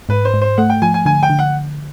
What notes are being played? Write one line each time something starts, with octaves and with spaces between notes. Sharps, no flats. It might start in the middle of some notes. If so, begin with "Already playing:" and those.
G#2 B4
C5
G#2
C5
A3 F#5
G5
F3 G#5
G#5
D3 G#5
G5
D3
F#5